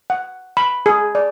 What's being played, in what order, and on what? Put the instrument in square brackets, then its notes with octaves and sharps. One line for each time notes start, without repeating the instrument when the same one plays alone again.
[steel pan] F#5
B5
G#4
D5